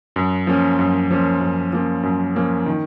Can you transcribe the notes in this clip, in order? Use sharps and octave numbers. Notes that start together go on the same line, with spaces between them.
F#2
F3 A#3 C#4
F#2
F3 A#3 C#4
F#2
F3 A#3 C#4
F#2
F3 A#3 C#4
D#3